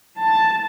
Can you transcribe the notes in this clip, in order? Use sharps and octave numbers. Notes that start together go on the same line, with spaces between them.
A5